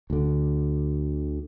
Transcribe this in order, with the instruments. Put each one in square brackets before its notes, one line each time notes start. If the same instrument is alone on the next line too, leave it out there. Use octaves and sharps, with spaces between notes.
[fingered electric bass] D2 D3